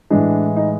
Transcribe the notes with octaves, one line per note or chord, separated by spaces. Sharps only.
A2 E3 G#3 D4
D#4